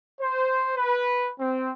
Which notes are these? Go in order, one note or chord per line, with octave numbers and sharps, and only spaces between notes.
C5
B4
C4